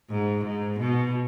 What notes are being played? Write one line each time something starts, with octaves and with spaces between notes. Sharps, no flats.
G#2
G#2
B2